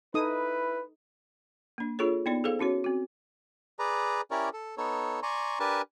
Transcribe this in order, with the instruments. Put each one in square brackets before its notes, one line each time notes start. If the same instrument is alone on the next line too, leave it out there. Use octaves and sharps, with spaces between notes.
[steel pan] D#4 A4 D#6 [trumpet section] E4 B4
[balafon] A#3 D4
D4 F4 G#4 A4 C#5
B3 D#4 E4 D5
G#4 A4 C5 F5
C#4 E4 F#4 C#5
C4 F#4
[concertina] G#4 B4 D5 A#5
C#4 E4 G4 A#4 C#5 D5
A4
B3 D#4 A4 C#5
D5 G#5 A#5 C6 C#6
D4 G4 A#4 B4 G#5 A5